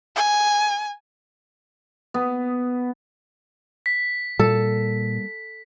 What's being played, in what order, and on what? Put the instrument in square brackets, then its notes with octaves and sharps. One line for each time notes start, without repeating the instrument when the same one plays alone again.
[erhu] G#5
[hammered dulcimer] B3
[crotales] B6
[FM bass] A#2 [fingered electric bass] G3 A#3 [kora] A4